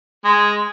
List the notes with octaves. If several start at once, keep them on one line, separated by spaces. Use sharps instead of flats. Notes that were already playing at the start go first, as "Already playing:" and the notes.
G#3